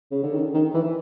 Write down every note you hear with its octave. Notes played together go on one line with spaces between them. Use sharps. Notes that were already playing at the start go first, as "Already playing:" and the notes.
C#3
D3
D#3
D#3
E3